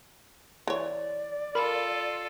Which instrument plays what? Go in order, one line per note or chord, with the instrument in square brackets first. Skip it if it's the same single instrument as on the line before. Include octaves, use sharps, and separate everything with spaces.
[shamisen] E3 C#5 [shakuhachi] D5
[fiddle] F4 A4 [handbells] A#4 B5